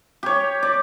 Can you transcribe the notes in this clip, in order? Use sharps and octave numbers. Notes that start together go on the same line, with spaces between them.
G4 C#5
D5